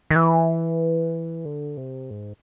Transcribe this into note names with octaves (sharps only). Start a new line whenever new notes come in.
D#3
E3
D3
C3
G#2